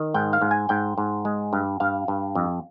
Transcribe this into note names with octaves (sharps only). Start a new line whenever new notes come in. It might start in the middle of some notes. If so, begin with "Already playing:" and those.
Already playing: D#3
G#2 G5
F5
G#2
G#5
G#2 G5
G#2
G#3
G2
G2 F5
G2
F2